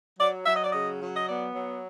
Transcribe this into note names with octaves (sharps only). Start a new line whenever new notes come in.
F#3 D5
F#3 E5
D#5
D5
C#3 D#5
F#3
D#5
B3 D5
F#3